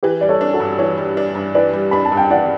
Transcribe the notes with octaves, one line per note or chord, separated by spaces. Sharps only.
E3 G4 B4
G3 D5
A4 C#5
D4
F#4 A4
G2
E3 A4 C#5
G3
D4
G2
E3 B4 D5
G3
D4 B5
A5
G2
G5
E3 D5 F#5